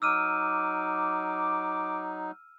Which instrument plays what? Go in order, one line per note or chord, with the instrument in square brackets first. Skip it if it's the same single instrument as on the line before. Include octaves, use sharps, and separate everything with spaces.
[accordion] F#3 D#4 [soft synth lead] D6 [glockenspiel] E6 F6 D#7